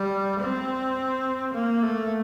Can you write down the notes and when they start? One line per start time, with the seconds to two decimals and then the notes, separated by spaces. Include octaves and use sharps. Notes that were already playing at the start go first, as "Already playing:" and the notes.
Already playing: G3
0.40 C4
1.54 A#3
1.83 A3